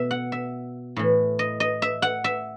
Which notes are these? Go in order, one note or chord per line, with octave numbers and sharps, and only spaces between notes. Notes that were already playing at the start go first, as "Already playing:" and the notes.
Already playing: B2 E5
F#5
E5
A2 E3
D#5
D#5
E5
F#5
E5